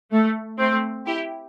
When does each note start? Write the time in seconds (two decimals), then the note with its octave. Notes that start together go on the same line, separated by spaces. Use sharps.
0.11 A3
0.59 A3 C4
1.06 E4 G4